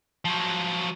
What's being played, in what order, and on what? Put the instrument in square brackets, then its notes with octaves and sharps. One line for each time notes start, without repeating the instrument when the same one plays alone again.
[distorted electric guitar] F3 F#3